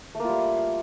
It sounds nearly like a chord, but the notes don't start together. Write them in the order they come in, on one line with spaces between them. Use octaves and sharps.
A3 A#3 F4 G3